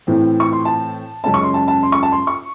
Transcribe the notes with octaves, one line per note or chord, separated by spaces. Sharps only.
A2 E3 C4
C#6
C6
A5
F#2 C#3 G#3 C#4 A5
C#6
C6
A5
A5
C6
C#6
A5
C6
C#6